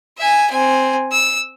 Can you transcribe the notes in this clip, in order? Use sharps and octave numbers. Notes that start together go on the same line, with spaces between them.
E5 G#5
C4 G#5
E6